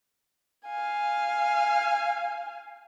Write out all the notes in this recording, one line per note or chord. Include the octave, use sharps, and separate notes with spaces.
F5 G#5